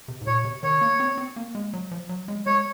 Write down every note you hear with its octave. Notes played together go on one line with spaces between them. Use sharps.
C3
G#2
A#2 C#5
C3
D#3 C#5
A#3
C4
C4
A#3
G#3
F#3
F3
F#3
G#3
G#3 C#5